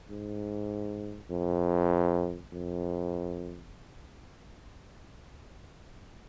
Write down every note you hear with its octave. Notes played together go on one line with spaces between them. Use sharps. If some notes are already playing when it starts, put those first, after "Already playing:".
G#2
F2
F2